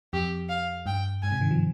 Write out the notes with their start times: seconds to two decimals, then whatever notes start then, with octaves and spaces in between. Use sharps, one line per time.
0.13 F2 G4
0.49 F5
0.86 G2 G5
1.22 G#2 G#5
1.32 C3
1.41 D#3
1.51 F3